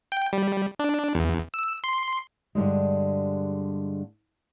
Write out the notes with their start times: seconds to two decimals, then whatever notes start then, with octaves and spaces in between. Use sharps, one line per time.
0.12 G5
0.33 G3
0.79 D4
1.15 E2
1.54 E6
1.84 C6
2.55 G2 D3 G3 G#3